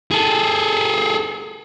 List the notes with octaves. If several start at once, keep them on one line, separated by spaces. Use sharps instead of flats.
G#4 A4